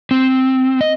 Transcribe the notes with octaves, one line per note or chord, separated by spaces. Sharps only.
C4
D#5